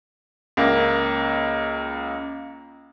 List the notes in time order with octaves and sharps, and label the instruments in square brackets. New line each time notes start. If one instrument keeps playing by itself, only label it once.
[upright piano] C#2 A#3